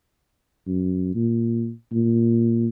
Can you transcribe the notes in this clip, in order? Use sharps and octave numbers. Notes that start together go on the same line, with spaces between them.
F#2
A#2
A#2